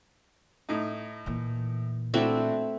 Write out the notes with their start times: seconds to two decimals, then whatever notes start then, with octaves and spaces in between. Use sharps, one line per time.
0.69 A2 D#4
1.26 A#2 E3
2.14 A3 C4 D4 E4 F#4 E5